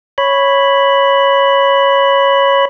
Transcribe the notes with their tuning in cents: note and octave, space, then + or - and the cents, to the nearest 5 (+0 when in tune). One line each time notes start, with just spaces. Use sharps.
C#5 -5 B5 +0